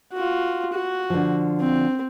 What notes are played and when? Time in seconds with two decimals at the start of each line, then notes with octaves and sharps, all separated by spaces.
0.13 F4 F#4
0.73 F#4
1.10 D3 F3
1.60 C4